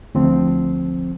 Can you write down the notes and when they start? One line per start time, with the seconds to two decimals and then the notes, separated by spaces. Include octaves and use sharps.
0.15 D2 F3 C4